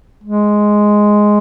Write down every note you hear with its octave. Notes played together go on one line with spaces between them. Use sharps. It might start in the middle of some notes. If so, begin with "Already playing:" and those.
G#3